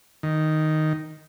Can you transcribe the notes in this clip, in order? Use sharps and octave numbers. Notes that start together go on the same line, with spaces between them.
D#3